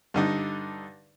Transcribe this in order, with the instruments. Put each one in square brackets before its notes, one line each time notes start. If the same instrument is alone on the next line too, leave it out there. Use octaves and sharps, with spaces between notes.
[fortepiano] G2 D3 D#4